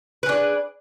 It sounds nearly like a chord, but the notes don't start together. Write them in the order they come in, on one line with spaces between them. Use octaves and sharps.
B4 G#4 D4